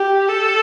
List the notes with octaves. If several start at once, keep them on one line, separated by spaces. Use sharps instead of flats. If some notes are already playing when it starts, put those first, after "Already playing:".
Already playing: G4
A4